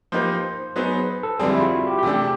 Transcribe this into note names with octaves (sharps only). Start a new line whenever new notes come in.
F3 A#3 D#4 G4 B4 C5
F#3 B3 D#4 G#4 B4 C5
A4
F2 D3 G3 C4 G#4
E4
F4
F#4
G4
G4
C3 E3 A3 D4 G#4
G4